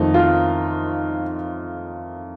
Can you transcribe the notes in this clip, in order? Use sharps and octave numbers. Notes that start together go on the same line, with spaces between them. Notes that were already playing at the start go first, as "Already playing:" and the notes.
Already playing: F2 D#3 A3 D#4
F4